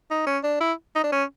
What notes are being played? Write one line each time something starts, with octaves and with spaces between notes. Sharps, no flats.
D#4
C#4
D4
E4
D#4
D4
C#4